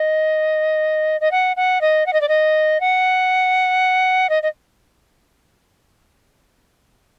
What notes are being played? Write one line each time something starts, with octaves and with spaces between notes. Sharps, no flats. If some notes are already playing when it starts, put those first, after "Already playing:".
Already playing: D#5
D#5
F#5
F#5
D#5
F#5
D#5
D5
D#5
F#5
D#5
D#5